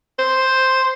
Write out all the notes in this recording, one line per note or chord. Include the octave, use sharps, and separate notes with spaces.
C5